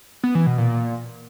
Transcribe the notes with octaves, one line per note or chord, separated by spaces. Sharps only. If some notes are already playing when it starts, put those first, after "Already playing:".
B3
E3
B2
A#2
A#2